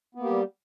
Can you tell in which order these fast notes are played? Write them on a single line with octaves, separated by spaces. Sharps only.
B3 A#3 G4 G3